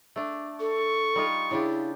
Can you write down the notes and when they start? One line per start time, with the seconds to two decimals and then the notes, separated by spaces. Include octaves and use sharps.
0.16 A3 D4
0.60 A4 C#6
1.15 G3 D#4 F4
1.51 C#3 D4 E4 G4